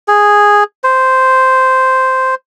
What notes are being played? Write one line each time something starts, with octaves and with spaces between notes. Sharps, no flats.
G#4
C5